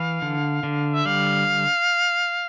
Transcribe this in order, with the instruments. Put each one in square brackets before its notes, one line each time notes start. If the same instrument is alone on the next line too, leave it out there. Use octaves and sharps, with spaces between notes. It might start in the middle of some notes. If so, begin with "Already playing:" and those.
Already playing: [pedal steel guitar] E3 [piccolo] F5
[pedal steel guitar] D3
D3
[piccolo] E5
[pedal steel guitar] G3 [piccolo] F5